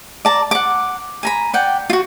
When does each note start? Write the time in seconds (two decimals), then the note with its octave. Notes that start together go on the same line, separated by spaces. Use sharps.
0.25 D5 A5 A#5
0.51 F#5 D6
1.23 G#5 A#5 B5
1.53 D5 F#5 G5
1.90 F4 F#4